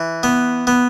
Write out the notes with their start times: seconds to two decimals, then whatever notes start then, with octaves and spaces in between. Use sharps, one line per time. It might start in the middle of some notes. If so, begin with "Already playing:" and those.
Already playing: E3
0.23 B3
0.67 B3